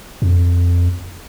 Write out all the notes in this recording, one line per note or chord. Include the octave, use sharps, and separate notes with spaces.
F2